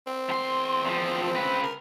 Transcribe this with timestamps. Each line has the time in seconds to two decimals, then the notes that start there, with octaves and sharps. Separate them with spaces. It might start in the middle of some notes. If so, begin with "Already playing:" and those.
0.07 C4
0.29 E2 C6
0.84 E2 F3
1.35 C#3 B4
1.63 A#4